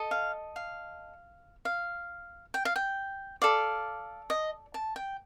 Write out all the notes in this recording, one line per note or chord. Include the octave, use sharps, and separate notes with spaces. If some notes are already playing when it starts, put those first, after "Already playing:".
Already playing: A4 D#5
F5
F5
F5
G5
F5
G5
A4 D5 F5
D#5
A5
G5